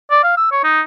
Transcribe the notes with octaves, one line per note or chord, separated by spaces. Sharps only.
D5
F5
E6
C#5
D#4